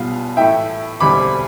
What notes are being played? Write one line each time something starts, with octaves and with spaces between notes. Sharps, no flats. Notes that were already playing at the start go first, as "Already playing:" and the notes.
Already playing: B1 B2 G3 B3 F4 F5
A2 E3 A3 E4 E5 G5
E1 D2 D3 G3 C4 B5 D6